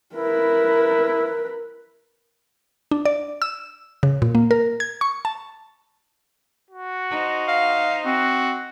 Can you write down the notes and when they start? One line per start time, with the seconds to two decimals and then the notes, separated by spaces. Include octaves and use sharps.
0.15 E4 A#4 B4
2.91 D4
3.05 D5
3.42 E6
4.03 C#3
4.22 A#2
4.35 A#3
4.51 A#4
4.80 G#6
5.01 C#6
5.25 A5
6.71 F#4
7.10 D#4 C5
7.48 F5
8.06 C4 F#4